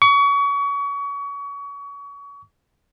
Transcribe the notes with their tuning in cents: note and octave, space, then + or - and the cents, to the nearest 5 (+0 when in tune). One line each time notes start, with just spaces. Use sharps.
C#6 +30